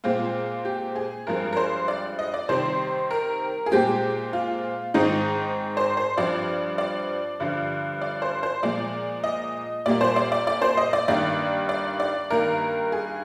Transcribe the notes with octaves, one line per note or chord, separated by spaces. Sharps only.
A#2 G#3 C4 F4
G4
G#4
G2 F3 G#3 C4 A#4
A#4
C5
D5
D#5
D5
C3 D#3 G3 C4 C5
A#4
G#4
A#2 G#3 C4 G4
F4
G#2 D#3 G#3 C4 D#4
C5
C5
G2 F3 C4 D5
D5
G2 D3 F3
D5
C5
C5
A#2 F3 G#3 D5
D#5
A#2 G3 A#3 D5
C5
D5
D5
D5
C5
D#5
D5
G2 D#3 G3 A#3 D5
D5
D5
G2 D#3 A#3 A#4
G#4